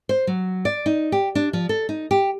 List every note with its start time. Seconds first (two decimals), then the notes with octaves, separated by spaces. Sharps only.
0.09 C5
0.27 F#3
0.65 D5
0.86 D#4
1.12 G4
1.35 D4
1.53 F3
1.69 A4
1.89 D#4
2.11 G4